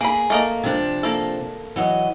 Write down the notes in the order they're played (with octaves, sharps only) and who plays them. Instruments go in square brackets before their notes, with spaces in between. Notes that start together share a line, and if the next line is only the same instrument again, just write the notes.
[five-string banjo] A#3 B5 [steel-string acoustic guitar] G#4
[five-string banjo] A3 A#3 D#5
[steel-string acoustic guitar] C3 F3 D4
[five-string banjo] A#3 A4
[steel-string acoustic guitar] E3 F#3 D#5